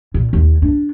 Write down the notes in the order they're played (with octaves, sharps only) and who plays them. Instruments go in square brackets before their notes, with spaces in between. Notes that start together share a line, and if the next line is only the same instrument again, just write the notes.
[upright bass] A#2
D#2
D4